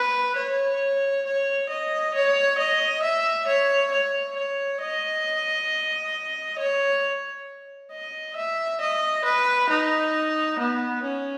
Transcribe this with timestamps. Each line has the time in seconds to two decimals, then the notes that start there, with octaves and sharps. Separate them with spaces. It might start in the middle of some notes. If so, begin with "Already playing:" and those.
Already playing: B4
0.37 C#5
1.26 C#5
1.70 D#5
2.15 C#5
2.59 D#5
3.03 E5
3.48 C#5
3.92 C#5
4.37 C#5
4.81 D#5
6.59 C#5
7.92 D#5
8.37 E5
8.81 D#5
9.25 B4
9.70 D#4
10.59 B3
11.04 C#4